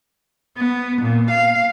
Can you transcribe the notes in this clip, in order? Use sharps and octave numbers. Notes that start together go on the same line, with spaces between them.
B3
A#2
F5